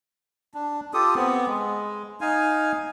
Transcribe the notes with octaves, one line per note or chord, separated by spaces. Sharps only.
D4
F4 G4 A4 D#6
B3 C4
G#3
D#4 F5 G#5